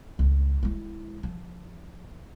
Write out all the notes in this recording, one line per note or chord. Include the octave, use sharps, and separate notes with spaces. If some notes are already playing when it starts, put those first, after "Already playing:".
C#2
G#3 E4
F3